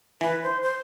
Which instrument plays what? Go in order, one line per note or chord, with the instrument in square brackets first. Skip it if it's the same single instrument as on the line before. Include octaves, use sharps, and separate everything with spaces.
[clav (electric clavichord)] E3 [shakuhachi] B4
[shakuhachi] C5
C5